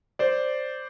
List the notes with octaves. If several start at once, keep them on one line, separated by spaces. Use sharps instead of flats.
C5 D5